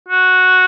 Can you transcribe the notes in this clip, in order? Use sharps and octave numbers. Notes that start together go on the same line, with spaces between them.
F#4